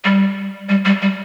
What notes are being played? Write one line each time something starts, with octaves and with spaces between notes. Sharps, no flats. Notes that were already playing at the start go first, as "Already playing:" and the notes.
G3
G3
G3
G3